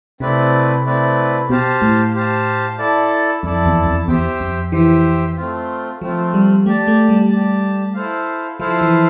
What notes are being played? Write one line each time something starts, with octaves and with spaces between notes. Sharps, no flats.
C3 A3 C4 E4 B4 D5
A3 C4 E4 B4 D5
B2 G4 C5 F5 A5
A2
G4 C5 F5 A5
E4 A4 D5 A5
F2 E4 A4 D5 A5
E2
F2
E2 G4 C5 E5 G5
F2
E3 G4 C5 E5 G5
A3 C4 F4
F3 A3 C4 F4
G3
A3 G4 D5 A5
A3
G3
G4 D5 A5
E4 A4 C5 F5
F3 E4 A4 C5 F5
E3